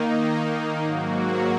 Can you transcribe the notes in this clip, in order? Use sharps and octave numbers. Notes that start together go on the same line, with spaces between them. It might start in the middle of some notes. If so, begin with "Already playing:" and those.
Already playing: D#3 A#3 D#4
G#2 F#3 A#3 F#4